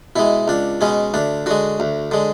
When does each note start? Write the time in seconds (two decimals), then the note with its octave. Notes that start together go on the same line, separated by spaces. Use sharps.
0.16 B2 G#3 E4
0.48 C#2 D4
0.81 B2 G#3 C#4
1.14 D2 D4
1.46 D3 G#3 F#4
1.80 D2
2.11 D3 G#3